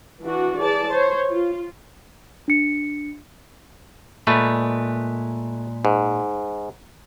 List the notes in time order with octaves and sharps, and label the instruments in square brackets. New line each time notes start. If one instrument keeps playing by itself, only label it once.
[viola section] E3 D4 F#4
E3 G#4 D5 A5
C5 C#5
F4
[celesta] D4 C#7
[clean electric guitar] A#2 G#3 B4 [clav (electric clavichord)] A3
[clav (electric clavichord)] G#2